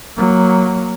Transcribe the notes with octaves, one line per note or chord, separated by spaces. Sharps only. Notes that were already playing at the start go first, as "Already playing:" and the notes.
F#3 A#3